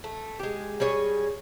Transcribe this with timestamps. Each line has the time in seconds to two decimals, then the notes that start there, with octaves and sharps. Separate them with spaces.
0.04 A3
0.39 G#3 G4
0.80 G3 G#4 C#5 D#5